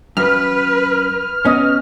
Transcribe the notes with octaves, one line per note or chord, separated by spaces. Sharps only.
F#2 B4 F6
B3 C#4 D#5